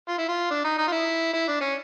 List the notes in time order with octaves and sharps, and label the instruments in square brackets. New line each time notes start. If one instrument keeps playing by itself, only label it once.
[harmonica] F4
E4
F4
D4
D#4
D#4
F4
E4
E4
D4
C#4